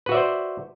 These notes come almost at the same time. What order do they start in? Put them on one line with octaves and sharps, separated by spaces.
B4 F#4 E5 D5 C5